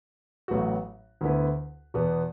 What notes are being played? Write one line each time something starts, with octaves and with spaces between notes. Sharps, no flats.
A1 A2 F#3 B3 F#4
D2 D3 B3 E4 B4
E2 B2 B3